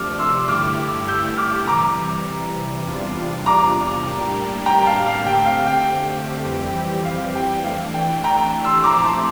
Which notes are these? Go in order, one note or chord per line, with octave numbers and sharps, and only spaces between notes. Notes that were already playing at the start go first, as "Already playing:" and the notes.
Already playing: C3 F3 A3 D4 D6 F6
C6 E6
G2 D3 A3 E4 G4 D6 F6
E6 G6
D6 F6
C3 E3 G3 A#5 D6
E2 C3 G3 D4 F4
A#5 D6
A2 G3 A#3 D4 G4
G5 A#5
F5 A5
F5
D3 A3 C4 G4 G5
F5
G5
F2 E3 G3 C4 G4
F5
G5
E3 A3 D4 F5
G5
G5 A#5
C6 E6
A#2 F3 A3 C4 E4 A#5 D6
A5 C6